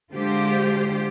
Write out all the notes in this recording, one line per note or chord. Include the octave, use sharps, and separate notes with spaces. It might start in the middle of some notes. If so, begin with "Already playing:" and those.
D3 G#3 F4 G4 C5